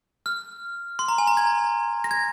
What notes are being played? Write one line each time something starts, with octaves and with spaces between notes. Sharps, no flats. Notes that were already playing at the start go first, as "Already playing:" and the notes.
F6
C6
A#5
G#5
A#5
G#6
A#6
G#6